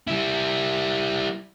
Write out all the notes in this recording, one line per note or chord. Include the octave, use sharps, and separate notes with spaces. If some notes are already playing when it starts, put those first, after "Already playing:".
G3 E4